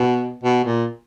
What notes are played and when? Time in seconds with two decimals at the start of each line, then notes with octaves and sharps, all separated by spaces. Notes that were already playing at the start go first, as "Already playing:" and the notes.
Already playing: B2
0.44 B2
0.64 A#2